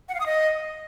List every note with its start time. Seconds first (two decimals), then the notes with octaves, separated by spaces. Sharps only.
0.09 F#5
0.14 F5
0.20 D#6
0.26 D#5